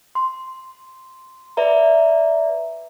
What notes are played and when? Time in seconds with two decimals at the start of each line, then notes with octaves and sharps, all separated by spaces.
0.15 C6
1.57 B4 D5 E5 A#5